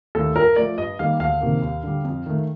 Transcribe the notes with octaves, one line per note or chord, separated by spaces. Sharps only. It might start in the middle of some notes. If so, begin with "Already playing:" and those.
D#2 D#3 A3 A4
G2 A#4
F3 A3 D5
G2 D#5
D#3 G3 A#3 F5
D2 F5
C3 D#3 A#3
D#2
D3 G3
F2
D#3 A3